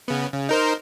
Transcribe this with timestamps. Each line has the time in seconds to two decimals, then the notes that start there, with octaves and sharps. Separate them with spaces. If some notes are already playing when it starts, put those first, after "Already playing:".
0.08 C#3 B3
0.33 C#3
0.49 D#4 A#4 C5